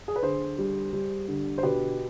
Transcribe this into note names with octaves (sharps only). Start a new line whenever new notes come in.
G#4
B4
D3 G#4 C5
G3
G3
D3
C5
B2 G4 B4